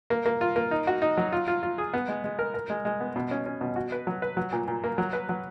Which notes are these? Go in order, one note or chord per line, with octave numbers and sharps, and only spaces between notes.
A#3
A#3
F4
A#3
D#4
F#4
D#4
F#3
F4
F4
F4
G#4
B3
G#3
G#3
A#4
A#4
G#3
G#3
B3
B2
C#4
C#4
B2
F#4
B4
F#3
B4
F#3
A#2
A#2
A#3
F#3
B4
F#3